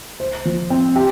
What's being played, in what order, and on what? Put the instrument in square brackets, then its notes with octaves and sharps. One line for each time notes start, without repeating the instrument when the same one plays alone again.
[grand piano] C5
F3
C4
G4